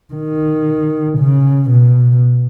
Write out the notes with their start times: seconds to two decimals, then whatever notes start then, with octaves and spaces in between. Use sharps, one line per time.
0.14 D#3
1.18 C#3
1.70 B2